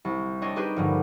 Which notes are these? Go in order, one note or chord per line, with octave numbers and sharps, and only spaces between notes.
C2
C4 D4 C#5 D#5
D#4 G4 G#4 B4 C5
A#1 G2 D3